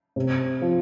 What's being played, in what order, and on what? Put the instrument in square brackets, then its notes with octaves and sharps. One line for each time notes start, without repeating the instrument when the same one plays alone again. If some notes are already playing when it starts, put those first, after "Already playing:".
[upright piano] C3
F3